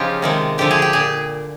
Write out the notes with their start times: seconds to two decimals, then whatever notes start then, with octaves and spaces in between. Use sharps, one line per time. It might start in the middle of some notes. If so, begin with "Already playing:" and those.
Already playing: C#3 F3 C#4 D#4 F4 G4
0.22 C3 D#3 G#3
0.58 D3 F3 A3 G4
0.71 G#4
0.82 G4
0.93 A#2 G#4